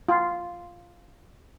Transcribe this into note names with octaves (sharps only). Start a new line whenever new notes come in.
F4